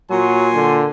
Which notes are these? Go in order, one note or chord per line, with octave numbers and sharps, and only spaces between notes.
A#2 F#3 G#5 C6
D3